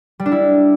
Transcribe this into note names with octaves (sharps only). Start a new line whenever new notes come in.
G3
D4
E4